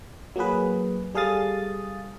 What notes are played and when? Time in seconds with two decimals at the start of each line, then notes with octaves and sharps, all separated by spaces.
0.36 F#3 A#3 F#4 G#4 B4
1.15 G3 G#4 A4 F5 D#6 A6